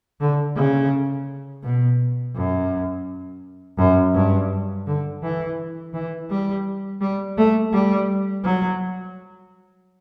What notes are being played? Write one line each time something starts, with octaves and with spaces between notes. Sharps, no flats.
D3
C#3
B2
F#2
F#2
G2
D3
E3
E3
G3
G3
A3
G3
F#3